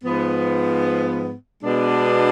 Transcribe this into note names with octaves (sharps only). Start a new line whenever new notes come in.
G#2 F3 B3
B2 G#3 B3 D4